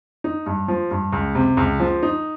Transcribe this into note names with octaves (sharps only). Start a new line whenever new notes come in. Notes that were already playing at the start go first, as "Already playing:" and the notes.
D#4
G2
F3
G2
C#2
C3
C#2
F3
D#4